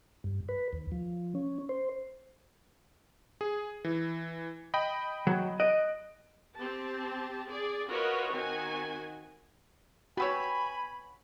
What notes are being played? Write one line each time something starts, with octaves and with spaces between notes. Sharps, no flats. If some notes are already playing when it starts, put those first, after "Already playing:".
G2
B4
D#2
F3
C#4
C5
G#4
E3
D#5 G5 B5
F#3
D#5 F#6 D7
C4 G4 A5
G#4 D5
F4 F#4 A#4 B4 C#5 D#5
D#3 C4 D#4 F#4 G#5
B3 F#4 B4 C#5 G5 G#5 B5 E6